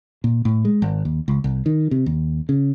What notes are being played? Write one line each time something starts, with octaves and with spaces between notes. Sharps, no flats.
A#2
A2
G#3
G#1
D#2
C#2
C2
D#3
C3
D#2
C#3